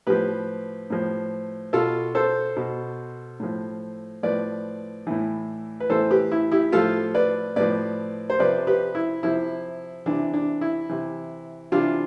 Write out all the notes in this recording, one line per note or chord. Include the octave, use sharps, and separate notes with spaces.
A2 F3 G4 B4
A2 F3
B2 F4 A4
A4 C5
B2
A2 F3
A2 F3 B4 D5
A2 E3
B4
A2 E3 A4 C5
G4 B4
E4
E4 G4
A2 F3 F4 A4
B4 D5
A2 F3 B4 D5
C5
C3 F3 B4 D5
G4 B4
E4
C3 F3 E4
C3 E3 D4
D4
E4
C3 E3
C3 E3 D4 F4